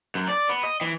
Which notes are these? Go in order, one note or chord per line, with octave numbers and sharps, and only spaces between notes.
F#2
D5
B3
D#5
E3